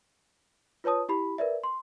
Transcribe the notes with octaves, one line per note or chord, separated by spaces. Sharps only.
F4 B4 C#5 A5 D#6
E4 G4 B5
A#4 B4 D5 E5
C6